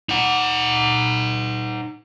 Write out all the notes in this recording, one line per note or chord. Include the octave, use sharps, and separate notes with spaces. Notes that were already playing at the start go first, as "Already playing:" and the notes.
D#4 F#5